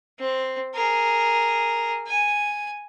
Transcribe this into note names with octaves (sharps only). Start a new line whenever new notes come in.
C4
G#4 A#4
G#5